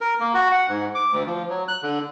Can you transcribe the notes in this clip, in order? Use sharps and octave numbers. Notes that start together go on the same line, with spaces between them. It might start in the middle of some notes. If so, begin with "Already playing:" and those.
A#4
A#3
F#4
F#5
G#2
D6
D2
F3
F#3
F#6
D3